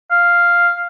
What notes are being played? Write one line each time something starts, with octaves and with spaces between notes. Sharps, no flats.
F5